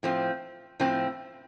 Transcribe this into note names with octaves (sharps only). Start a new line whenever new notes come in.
A2 F3 C4
A2 F3 C4